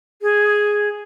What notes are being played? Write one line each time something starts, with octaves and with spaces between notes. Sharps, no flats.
G#4